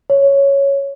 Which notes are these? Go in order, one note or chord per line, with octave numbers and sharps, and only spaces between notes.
C#5